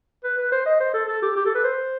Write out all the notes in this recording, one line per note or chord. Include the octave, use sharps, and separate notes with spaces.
B4
B4
C5
D#5
C5
A4
A4
G4
G4
A4
B4
C5